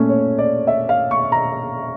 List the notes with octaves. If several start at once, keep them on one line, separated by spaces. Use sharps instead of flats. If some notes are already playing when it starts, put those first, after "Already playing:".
Already playing: A#2 A3 C#4
C#5
D5
E5
F5
C#6
A#5